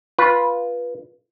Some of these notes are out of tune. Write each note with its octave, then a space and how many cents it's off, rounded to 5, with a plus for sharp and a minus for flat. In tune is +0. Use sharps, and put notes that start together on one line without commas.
F4 +0 B4 -15